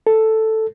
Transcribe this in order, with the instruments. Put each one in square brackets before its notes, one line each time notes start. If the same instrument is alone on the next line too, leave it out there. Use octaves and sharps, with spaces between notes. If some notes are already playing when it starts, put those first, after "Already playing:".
[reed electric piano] A4